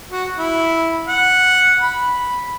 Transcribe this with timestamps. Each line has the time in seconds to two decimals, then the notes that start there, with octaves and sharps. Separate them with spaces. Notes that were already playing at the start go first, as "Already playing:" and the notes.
0.10 F#4
0.36 E4
1.07 F#5
1.81 B5